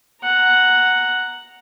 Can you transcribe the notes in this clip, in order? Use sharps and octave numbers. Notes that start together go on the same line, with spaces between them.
F#5 A#5